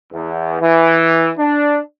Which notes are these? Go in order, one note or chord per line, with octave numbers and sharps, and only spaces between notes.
E2
E3
D4